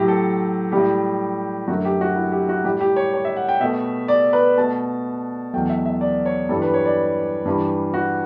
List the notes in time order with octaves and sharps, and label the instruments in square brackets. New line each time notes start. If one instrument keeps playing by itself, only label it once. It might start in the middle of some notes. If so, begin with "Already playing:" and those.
Already playing: [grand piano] A2 F#3 A3 G4
A4
A2 G3 G4
F#2 D3 A3 F#4
G4
F#4
E4
G4
F#4
A2 G3 G4
G4
C#5
C#5
E5
F#5
G5
B2 A3 E5
D5
B4
B2 A3 A5
E2 B2 F#3 A3 G5
E5
E5
D5
C#5
G2 E3 G3 A4
B4
C#5
D5
G2 E3 G3
F#4